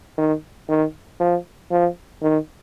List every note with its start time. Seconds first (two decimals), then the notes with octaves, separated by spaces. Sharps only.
0.18 D#3
0.68 D#3
1.20 F3
1.71 F3
2.22 D#3